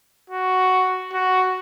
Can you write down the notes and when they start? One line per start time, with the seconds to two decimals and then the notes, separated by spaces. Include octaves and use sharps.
0.30 F#4
1.13 F#4